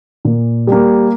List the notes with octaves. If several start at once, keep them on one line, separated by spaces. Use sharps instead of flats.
A#2
G3 A#3